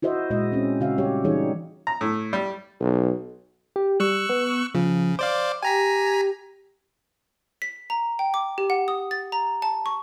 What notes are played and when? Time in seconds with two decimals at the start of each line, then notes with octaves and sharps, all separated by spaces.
0.02 E4 F#4 C5 D#5 E5
0.30 A#2 G#3 F#4 D#5
0.52 C4 C#4
0.80 C#3 F#4 E5 F5
0.98 G3 G4 C#5
1.24 E3 G3 D#4 G#4 C#5
1.87 A#5
2.01 A2
2.33 G3
2.80 B1
3.76 G4
4.00 G3 C#6 E6 F#6
4.29 B3
4.75 C#3 F3
5.19 C5 D5 F5 D6
5.63 G4 G#5 A#5 B6
7.62 B6
7.90 A#5
8.19 G5
8.34 D6
8.58 G4
8.70 F#5
8.88 D#6
9.11 A6
9.32 A#5
9.62 A5
9.86 C#6